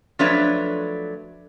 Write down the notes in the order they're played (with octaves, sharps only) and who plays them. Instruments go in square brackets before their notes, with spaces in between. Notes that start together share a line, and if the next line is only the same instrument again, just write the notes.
[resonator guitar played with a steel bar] F3 F#3 A3 D4 B4 C#5